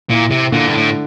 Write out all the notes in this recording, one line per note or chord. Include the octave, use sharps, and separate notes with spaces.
A#2 E4
C3
A#2 D3
G2
A2